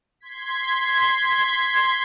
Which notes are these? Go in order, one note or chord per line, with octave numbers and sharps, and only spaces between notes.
C6 G#6 B6